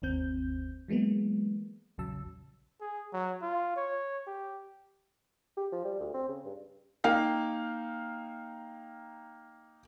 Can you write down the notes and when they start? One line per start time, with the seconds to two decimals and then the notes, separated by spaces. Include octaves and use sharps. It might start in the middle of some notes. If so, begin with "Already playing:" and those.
0.02 G1 D#2 C4 G6
0.88 E3 F#3 G#3 A#3 B3
1.98 A#1 E2 C#3 F#3 A5 E6
2.81 G#4
3.13 F#3
3.42 F4
3.76 C#5
4.27 G4
5.57 G4
5.72 F3
5.84 G3
6.00 D2
6.14 C4
6.28 C#3
6.45 G2
7.04 A#3 D#4 F5 G5